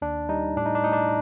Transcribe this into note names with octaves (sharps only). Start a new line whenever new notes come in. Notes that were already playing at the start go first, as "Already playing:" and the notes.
D#2 D4
G3 D#4
A2 D4
D#4
D4
A2 D#4
D4